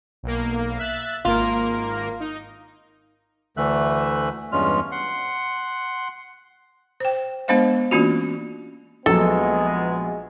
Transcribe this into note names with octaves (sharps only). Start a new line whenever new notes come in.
B1 A#3
E5 F#6 A6
G#1 A#3 F4 A#4
D#4
D2 D3 E3 A3 E5 F#6
E2 G2 G#3 C#4 F4 F6
F#5 C6
C5 G5
G#3 B3 D4 C5 D#5 F5
E3 A#3 C#4 D4 F4 F#4
A#1 F#3 G#3 B3 A4